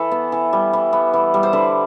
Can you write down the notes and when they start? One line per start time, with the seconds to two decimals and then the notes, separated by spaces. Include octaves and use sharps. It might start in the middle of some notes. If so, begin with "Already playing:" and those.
Already playing: E3 A4 B4
0.11 B3
0.32 E3
0.53 G3
0.73 E3
0.93 B3
1.13 E3
1.34 G3
1.43 C5
1.53 D3 B4